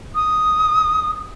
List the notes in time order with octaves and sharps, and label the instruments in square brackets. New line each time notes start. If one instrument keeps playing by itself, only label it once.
[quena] D#6